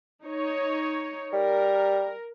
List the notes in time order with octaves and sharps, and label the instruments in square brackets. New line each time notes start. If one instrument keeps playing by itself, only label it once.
[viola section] D#4 C#5
[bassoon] G3 [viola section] A#4